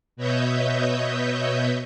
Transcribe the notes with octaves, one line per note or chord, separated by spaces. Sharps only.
B2 B4 C#5 D#5 E5 G6